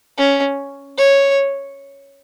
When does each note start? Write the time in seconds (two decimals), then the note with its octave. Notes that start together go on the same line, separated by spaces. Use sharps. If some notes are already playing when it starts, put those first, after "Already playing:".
0.18 C#4
0.98 C#5